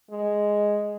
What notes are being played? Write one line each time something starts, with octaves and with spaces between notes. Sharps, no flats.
G#3